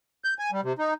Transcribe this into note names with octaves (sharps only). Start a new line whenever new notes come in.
G6
G#5
G3
C3
D#4